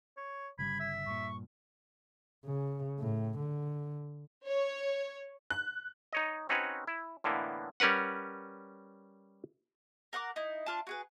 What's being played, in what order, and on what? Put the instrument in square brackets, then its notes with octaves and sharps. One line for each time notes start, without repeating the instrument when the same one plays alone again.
[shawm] C#5
[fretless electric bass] G1 C#3 G3 [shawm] B5 [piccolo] G#6
[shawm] E5
[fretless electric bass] G2 A#2 [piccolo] C#6
[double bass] C#3
A2
D3
[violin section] C#5
[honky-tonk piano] F#6
[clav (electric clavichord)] D#4 C#5 D#5
C4 C#4 D#4 F#4 B4 C#5
E4
A2 D3 E3 A#3 B3
G3 C#4 A#4 B4 F#5
[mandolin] A#4 F#5 C#6 D6
D#4 E4
D4 F4 A5
F#4 G#4 B4